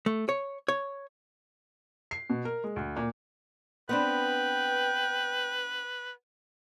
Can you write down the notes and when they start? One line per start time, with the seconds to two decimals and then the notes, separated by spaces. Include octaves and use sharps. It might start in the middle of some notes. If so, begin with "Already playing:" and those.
0.06 A3
0.29 C#5
0.68 C#5
2.11 C7
2.30 B2
2.45 A#4
2.64 G#3
2.76 D2
2.96 A#2
3.89 B3 C4 D4 B4 G5